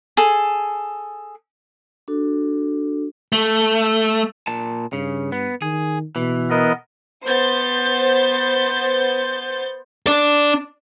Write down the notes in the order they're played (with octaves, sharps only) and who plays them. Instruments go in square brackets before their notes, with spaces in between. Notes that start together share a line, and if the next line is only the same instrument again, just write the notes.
[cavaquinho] G#4 A4
[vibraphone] D4 F#4 A4
[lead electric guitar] A3
A#2 A5
[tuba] G2 [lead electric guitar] C#3
[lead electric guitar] B3
[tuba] D#3 [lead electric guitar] G#4
[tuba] B2 [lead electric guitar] E3
[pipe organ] B3 A#4 D#5
[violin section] B3 C5 G6 A6
[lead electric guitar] D4 D5